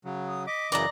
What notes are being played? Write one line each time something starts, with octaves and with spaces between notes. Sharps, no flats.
C#3 F#3
D#6
D#5 D6 B6
F#2 C#3 E3 D5 D#5 A#5 A#6